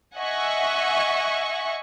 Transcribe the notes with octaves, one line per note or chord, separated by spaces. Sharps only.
D#5 E5 F#5 G#5 C#6